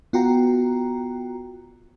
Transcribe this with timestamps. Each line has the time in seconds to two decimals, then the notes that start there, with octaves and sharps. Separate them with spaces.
0.13 B3 F4 F#4 G5 A#5